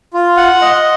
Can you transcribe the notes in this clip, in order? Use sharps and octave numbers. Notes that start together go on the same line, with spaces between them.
F4
F#5
D#5